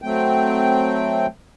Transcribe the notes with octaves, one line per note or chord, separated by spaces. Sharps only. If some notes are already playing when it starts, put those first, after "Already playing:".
F#3 A3 C4 G5